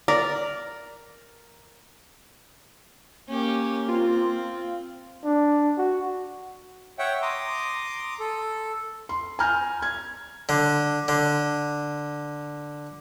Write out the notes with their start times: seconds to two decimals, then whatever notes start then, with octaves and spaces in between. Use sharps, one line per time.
0.08 A#4 D5
3.29 A#3 C#4 G4
3.89 C4 F4
5.24 D4
5.77 F#4
6.99 C#5 E5 F#5 G5
7.22 A#5 C6 D6 D#6
8.20 A4
9.09 C6
9.39 G#5 A#5 F6 G6 A#6
9.82 G#6
10.49 D3
11.08 D3